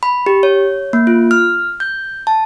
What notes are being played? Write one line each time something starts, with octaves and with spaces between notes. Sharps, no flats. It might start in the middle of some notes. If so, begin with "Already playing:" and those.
B5
G4
C#5
A#3
F4
F6
G6
A5